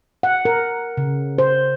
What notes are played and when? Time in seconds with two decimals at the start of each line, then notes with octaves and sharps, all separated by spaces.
0.23 F#5
0.45 A#4
0.97 C#3
1.38 C5